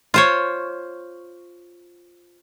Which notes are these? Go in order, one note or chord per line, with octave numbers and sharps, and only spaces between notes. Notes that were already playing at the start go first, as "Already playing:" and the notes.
F4 C5 C#5